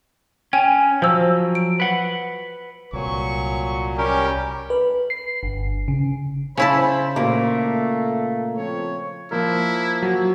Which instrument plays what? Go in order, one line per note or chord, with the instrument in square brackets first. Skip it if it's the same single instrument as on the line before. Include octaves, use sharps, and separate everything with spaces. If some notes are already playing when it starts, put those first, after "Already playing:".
[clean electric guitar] C#4 [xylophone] G5 G#5
[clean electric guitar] F3 F#3 [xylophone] C5 E6
[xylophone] D7
[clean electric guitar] B4 F#5
[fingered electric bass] C2 [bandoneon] A#2 F#3 [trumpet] C#6
[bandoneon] G3 C#4 A#4 [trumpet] G4
[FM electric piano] B4
C7
G1
C#3
[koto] C#3 E4 A5 [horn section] C5 B5
[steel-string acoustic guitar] A#2 A#3 [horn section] A3
[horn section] F3 C4 C#5
[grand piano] F3 A#3 A#4 [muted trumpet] E4
[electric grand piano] F#3